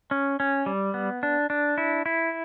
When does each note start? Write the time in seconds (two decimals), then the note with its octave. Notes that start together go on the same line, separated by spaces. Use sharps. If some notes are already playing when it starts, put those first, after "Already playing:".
0.11 C#4
0.40 C#4
0.66 G3
0.94 B3
1.23 D4
1.50 D4
1.78 E4
2.06 E4